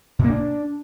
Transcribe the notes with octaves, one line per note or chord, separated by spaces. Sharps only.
B2
A#3
D4